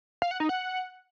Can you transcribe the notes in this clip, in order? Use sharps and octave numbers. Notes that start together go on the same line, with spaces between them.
F5
F#5
D#4
F#5